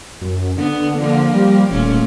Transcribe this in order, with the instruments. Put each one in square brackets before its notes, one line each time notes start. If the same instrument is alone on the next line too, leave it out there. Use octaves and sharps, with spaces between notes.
[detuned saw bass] F#2
[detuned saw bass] D3 [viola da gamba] B3
[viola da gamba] F3 A#3
[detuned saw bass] G3
[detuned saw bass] D#1 [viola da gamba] A#2 A3 C#4